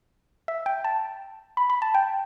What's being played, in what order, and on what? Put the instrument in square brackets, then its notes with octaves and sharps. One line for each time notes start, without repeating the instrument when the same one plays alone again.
[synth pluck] E5
G5
A5
B5
B5
A5
G5